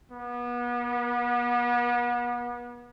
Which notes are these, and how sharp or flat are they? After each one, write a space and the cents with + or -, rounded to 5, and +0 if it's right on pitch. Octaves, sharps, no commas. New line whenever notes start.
B3 -35